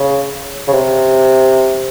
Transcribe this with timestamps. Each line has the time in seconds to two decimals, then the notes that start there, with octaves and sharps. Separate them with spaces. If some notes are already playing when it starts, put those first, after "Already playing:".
Already playing: C#3
0.68 C#3
0.73 C3